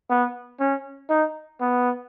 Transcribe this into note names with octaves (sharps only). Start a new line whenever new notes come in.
B3
C#4
D#4
B3